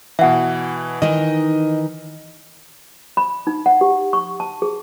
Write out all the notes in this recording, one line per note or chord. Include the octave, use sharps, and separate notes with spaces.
B2 E3 E5 F#5
D#3 E3 D#4 D#5
B5
D#4
F#5
G4
C#6
A5
G#4